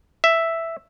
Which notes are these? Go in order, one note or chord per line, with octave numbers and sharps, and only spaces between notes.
E5